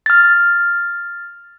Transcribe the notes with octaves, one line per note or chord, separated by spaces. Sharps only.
F6 A6